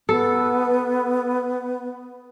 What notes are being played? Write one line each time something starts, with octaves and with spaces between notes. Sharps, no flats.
B3 A4